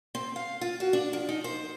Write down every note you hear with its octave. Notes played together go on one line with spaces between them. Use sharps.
C4
F5
F4
F#4
D4
F3
D#4
C5